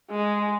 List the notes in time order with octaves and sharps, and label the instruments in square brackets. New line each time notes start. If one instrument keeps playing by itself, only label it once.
[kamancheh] G#3